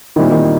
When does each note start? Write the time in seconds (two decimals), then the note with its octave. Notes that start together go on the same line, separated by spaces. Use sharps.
0.16 A#2 D#3 G3 C4 E4
0.31 D#3